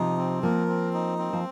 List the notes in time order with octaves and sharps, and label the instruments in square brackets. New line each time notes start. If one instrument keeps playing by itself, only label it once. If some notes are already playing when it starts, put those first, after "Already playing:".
Already playing: [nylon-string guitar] C3 F3 [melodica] D#4
[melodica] C4
[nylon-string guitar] F3 A#3 [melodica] A#4
[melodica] C4
D#4
C4
[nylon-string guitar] F3